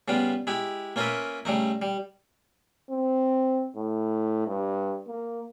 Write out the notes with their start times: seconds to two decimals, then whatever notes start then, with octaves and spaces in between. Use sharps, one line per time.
0.08 C#3 G3 B3 F4
0.47 G#3 E4 G4
0.96 A#3 C#4 F4 A#4 B4 E5
1.45 C#3 G3 A3 D#4
1.82 G3
2.90 C4
3.76 A2
4.47 G2
5.08 A#3